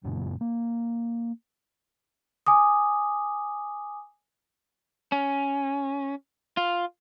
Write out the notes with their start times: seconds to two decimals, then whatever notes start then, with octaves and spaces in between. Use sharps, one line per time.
0.03 G1 F#2 A#2 C#3
0.41 A#3
2.46 G#5 D6 D#6
5.12 C#4
6.57 F4